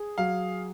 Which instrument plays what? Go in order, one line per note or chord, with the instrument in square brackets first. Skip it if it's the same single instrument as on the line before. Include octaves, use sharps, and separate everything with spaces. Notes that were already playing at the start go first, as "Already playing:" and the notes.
Already playing: [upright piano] G#4
[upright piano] F#3 [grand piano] F5